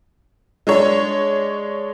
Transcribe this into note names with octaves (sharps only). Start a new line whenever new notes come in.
G#3 D4 C#5